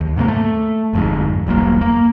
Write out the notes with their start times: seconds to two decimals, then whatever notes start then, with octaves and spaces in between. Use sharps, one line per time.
0.01 D#2
0.16 G#2 C3 A3 A#3
0.28 A3
0.93 G1 F2 G#2
1.47 E1 B1 G2 A#3
1.81 A#3